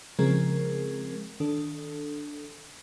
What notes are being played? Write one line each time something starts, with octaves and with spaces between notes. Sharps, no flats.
C#3 F3 G#3 C4 G#4 A#4
D#3 D4 A4